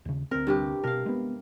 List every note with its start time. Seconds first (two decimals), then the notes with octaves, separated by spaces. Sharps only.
0.05 D#2 C#3
0.31 D2 C4 A#4
0.47 G2 C3 G4
0.84 B2 D4 A#4 F5
1.06 G#3 B3